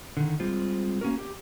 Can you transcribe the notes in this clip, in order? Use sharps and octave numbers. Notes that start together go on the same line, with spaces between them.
D3 D#3
G3 G#3 C4 F4
A#3 C#4 F#4 A#4
G4